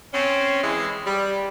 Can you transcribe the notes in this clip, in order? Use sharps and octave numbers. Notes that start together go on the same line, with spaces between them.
C4 C#4
E3 G#3
G3